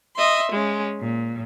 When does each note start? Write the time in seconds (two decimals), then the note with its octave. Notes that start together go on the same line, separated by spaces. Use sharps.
0.17 D#5 E5 C6
0.51 G#3 C#4
1.01 A#2